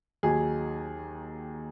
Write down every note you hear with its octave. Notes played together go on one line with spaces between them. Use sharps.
D#2 D#3 F#3 G#4